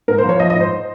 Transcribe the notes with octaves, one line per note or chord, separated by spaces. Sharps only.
G#2 A#4
C5
F3
C#5
F3 D#5
D#5
G#2 C5